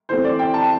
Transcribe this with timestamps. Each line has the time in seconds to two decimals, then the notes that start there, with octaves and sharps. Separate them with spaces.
0.09 E3 A3 C4 C5
0.24 D5
0.39 G5
0.54 A5